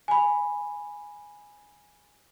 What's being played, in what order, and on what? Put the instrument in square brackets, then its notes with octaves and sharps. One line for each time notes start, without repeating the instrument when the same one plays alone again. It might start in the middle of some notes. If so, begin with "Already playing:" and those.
[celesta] G#5 B5